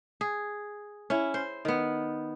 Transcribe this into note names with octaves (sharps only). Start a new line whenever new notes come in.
G#4
C#4 E4
C5
D#3 B3